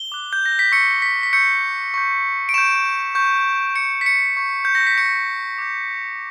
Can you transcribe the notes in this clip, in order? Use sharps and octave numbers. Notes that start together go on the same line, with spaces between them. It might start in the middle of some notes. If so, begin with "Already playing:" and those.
Already playing: G7
D6 F#6
G6
A#6
B6
C#6 E6 G6 C#7
B6
B6
C#6 E6 G6 C#7
C#6 G6
D7
C#6 G6 E7
C#6 G6
C#6 G6 C#7
B6
C#7
C#6 G6
G6
A#6
B6
C#6 G6 C#7
D6 G6